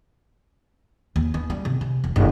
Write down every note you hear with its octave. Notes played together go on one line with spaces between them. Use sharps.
D#2
B3
G3
C3
C3
E1
F#1